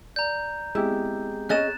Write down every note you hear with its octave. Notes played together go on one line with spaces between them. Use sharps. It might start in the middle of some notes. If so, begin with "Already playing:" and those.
D5 A#5 G6
G#3 B3 C4 E4 G4
C#4 G#4 D#5 F#6 A6 E7